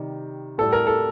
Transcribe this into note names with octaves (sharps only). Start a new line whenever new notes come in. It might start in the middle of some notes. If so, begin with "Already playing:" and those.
Already playing: C3 D#3 G3
A2 G3 A4
A#4
A4